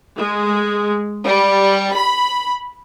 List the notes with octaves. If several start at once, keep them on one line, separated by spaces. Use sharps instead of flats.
G#3
G3
B5